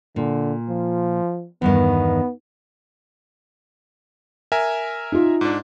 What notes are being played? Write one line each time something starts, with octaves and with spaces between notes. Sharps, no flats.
A#2 D3
F3
E2 G2 D#3 B3
A#4 E5 G#5
D#4 F4
G#2 D4